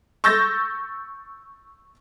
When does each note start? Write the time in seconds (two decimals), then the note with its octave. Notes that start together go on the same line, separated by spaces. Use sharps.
0.24 C#6 E6 G6 A6 A#6